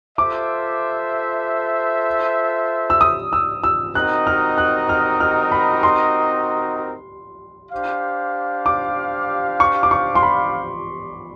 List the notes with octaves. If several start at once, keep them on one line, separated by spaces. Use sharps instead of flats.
F4 A4 C5 E5 D6
E6
D#6
E6
E6
C4 D#4 F#4 A#4 D#5 F#6
F6
F#6
F6
F6
B5
C6
D4 G4 C5 F5
D6
C#6
D6
C#6
C6
B5